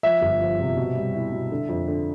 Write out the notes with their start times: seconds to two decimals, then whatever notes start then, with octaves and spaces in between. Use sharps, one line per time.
0.03 F3 E5
0.22 G1
0.41 F3
0.60 C3
0.77 B2
0.95 G3
1.14 E4
1.33 B2
1.51 D3
1.69 F2
1.88 D3